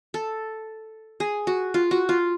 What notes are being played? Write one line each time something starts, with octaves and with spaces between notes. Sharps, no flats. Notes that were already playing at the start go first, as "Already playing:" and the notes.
A4
G#4
F#4
F4
F#4
F4